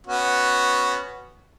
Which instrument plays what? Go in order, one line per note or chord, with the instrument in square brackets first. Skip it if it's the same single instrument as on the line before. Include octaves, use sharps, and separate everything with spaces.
[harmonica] B3 C#4 F#4